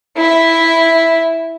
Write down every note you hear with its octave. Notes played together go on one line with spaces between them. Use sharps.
E4 E5